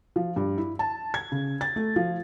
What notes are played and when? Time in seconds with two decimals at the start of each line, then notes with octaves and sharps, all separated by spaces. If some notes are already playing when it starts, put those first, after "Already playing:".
0.16 F3
0.36 G2
0.58 E4
0.79 A5
1.14 G#6
1.32 C#3
1.61 A6
1.76 A3
1.96 F3